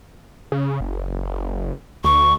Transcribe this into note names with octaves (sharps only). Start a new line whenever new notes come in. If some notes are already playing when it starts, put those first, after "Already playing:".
C#3
F#1
D2 C#6